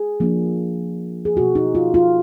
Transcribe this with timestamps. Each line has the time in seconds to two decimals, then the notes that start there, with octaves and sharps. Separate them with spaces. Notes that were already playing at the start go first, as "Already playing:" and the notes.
Already playing: G#4
0.20 F3 A#3 D4
1.25 G#4
1.36 B2 F#3 A#3 F#4
1.55 D#4
1.75 F4
1.94 F4